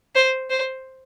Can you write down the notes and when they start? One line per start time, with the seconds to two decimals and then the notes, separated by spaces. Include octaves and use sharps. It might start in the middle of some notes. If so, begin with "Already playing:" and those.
0.15 C5
0.50 C5